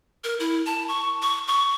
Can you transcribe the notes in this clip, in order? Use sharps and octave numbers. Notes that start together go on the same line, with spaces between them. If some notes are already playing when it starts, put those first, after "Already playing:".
A#4
E4
A5
C#6
C#6
C#6